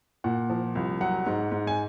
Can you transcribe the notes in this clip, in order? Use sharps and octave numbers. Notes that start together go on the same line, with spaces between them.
A#2 F#5
F3
C2
F#3 F#5
G#2
G#2
G#5